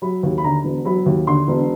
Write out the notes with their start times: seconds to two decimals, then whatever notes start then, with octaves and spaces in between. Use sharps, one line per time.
0.02 F#3 B5
0.23 D#2
0.38 B5
0.44 D3 A#5
0.64 E1
0.85 F#3 B5
1.06 D#2
1.27 D3 C6
1.48 E1